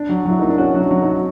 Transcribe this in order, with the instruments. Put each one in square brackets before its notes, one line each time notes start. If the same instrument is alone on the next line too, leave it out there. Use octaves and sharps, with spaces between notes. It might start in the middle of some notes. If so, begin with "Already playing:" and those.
Already playing: [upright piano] D4
[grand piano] F#3
[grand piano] F#3 [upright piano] E4
[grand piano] A#3 [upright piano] D#4
[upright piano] D4
[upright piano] C#4 [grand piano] F#4
[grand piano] F#3
[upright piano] D4
[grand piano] F#3
[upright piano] D#4
[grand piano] F#4